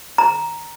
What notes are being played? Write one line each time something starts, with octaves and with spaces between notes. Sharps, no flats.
A#5